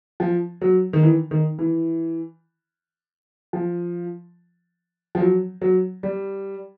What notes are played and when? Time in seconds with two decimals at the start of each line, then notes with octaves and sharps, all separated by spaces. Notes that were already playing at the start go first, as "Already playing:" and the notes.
0.20 F3
0.61 F#3
0.93 D#3
1.03 E3
1.31 D#3
1.59 E3
3.53 F3
5.15 F3
5.20 F#3
5.62 F#3
6.03 G3